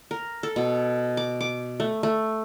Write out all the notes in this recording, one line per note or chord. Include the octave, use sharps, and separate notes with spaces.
A#4
A4
B2
D6
D6
A3
A3